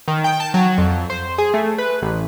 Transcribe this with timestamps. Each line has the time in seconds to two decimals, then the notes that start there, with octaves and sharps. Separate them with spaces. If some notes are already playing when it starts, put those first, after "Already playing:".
0.08 D#3
0.24 G5
0.40 A5
0.54 F#3
0.78 F2
1.10 C5
1.38 G#4
1.54 A3
1.78 B4
2.02 A1